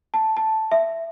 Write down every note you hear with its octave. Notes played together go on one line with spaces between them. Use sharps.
A5
A5
E5